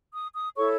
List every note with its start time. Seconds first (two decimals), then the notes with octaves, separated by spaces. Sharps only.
0.13 D#6
0.34 D#6
0.56 E4 A4 C#5 C#6